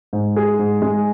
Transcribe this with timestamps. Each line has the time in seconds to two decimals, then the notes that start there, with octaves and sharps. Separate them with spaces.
0.13 G#2
0.36 G#4
0.59 G#2
0.82 G#3